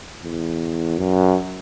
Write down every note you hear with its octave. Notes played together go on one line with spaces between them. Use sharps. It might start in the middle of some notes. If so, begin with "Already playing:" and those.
E2
F#2